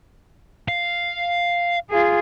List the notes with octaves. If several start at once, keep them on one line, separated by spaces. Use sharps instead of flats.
F5
F4 G#4